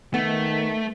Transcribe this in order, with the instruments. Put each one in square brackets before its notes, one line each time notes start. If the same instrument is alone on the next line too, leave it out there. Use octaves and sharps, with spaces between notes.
[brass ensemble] D#3 [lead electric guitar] A3 [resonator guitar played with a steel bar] B3